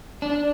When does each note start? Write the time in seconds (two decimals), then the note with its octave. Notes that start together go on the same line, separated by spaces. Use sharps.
0.22 D4